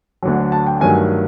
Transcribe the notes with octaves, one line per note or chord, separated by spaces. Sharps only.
D2 D3 F#3
A5
G5
G2 D#3 F#3 A3 G#5